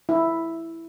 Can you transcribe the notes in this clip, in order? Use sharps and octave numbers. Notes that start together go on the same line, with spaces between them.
E4